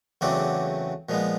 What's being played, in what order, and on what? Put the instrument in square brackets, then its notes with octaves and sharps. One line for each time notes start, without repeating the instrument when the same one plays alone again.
[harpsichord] E2 C#3 F#3 A3 C4 D5
A#2 F3 G#3 B3